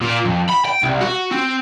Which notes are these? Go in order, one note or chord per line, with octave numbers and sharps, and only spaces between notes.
A#2
F2
B5
G5
C2
F#4
C4